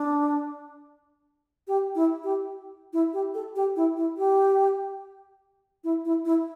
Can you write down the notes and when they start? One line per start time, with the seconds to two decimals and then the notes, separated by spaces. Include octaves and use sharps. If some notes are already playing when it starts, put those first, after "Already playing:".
Already playing: D4
1.68 G4
1.95 E4
2.24 G4
2.93 E4
3.13 G4
3.34 A4
3.56 G4
3.76 E4
3.97 E4
4.18 G4
5.84 E4
6.05 E4
6.25 E4